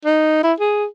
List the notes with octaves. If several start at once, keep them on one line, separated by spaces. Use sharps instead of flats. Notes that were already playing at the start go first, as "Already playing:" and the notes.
D#4
E4
G#4